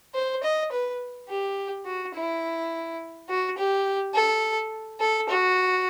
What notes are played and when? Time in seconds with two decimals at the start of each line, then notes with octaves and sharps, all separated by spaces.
0.14 C5
0.43 D#5
0.72 B4
1.29 G4
1.85 F#4
2.14 E4
3.29 F#4
3.57 G4
4.14 A4
5.00 A4
5.29 F#4